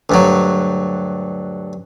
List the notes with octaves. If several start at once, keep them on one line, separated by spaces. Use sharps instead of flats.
D2 G2 F#3